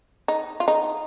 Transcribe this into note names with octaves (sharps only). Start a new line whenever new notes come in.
D#4
F4
D#4